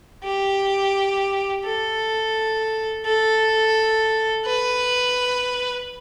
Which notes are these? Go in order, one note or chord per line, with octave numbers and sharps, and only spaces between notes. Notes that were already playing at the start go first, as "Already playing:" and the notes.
G4
A4
A4
B4